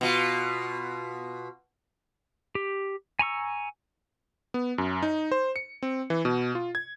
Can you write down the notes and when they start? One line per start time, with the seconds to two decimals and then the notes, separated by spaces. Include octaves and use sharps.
0.01 B2 F4
2.55 G4
3.19 G#5 A#5 C#6 E6
4.54 B3
4.78 F#2
5.02 D#4
5.32 C5
5.56 C#7
5.83 C4
6.10 E3
6.25 B2
6.55 F4
6.75 G#6